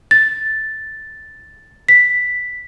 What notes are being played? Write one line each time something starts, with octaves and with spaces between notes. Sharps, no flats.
A6
B6